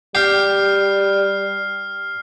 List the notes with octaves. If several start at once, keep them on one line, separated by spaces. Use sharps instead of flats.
G3 G4 F6 C7